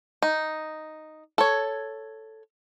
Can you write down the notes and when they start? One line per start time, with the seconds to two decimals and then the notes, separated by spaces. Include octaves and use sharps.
0.22 D#4
1.38 A4 C#5